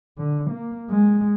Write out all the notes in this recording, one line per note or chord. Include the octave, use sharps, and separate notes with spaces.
D3
A#3
G#3